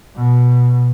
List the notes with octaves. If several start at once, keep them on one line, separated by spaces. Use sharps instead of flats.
B2